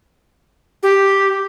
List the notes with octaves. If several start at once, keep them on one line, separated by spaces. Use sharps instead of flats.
G4